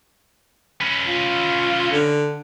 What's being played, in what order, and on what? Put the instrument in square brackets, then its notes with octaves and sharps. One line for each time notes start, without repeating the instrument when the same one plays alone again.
[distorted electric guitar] C#4 B4
[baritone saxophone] F4
D3